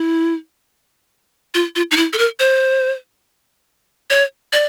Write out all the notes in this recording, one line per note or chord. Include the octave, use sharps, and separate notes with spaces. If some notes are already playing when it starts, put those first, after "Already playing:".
Already playing: E4
F4
F4
D#4
E4
A4
A#4
C5
C#5
D5